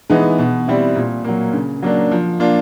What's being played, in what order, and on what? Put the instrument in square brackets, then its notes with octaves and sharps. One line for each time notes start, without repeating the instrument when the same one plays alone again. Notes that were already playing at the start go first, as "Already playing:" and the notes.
[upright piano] E3 G#3 B3 D#4
B2
G3 C4 E4
A#2
F#3 A#3
C#3
F#3 A#3 D4
F3
A#3 D4 F4